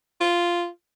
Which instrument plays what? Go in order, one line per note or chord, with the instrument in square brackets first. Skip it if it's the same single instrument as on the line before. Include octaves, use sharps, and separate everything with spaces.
[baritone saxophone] F4